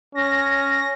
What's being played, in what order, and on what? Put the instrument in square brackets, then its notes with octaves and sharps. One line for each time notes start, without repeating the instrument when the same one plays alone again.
[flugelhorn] C#4 [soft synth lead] A#6